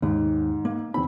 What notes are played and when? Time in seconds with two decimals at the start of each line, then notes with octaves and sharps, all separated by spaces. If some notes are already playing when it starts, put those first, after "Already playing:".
0.02 D#2 G#2
0.65 A#3
0.94 E2 C4 B5